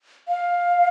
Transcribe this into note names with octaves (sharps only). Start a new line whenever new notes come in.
F5